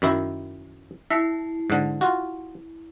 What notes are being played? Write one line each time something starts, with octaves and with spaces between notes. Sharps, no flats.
F#2 D#3 E4
E4 E5 A5 C7
G#2 D3
F4 F#4